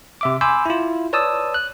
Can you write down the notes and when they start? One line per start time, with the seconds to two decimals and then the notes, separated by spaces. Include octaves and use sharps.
0.21 C3 E5 D6
0.41 G#5 B5 C6 D6 E6 G6
0.66 E4 F4
1.13 B4 C#5 D5 A5 D#6 E6
1.54 F#6